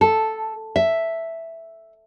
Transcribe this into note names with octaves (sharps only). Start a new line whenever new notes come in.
A4
E5